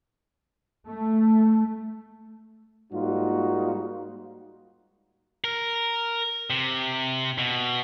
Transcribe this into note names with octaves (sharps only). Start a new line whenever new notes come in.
A3
G#2 G3 A#3 D#4 F4 F#4
A#4
C3
B2